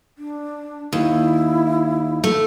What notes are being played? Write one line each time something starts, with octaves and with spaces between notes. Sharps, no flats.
D4
D#2 E4
A3